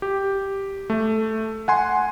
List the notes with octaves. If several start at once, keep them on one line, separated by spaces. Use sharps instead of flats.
G4
A3
F#5 G#5 C6